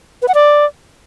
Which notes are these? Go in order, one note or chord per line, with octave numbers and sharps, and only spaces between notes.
B4
F#5
D5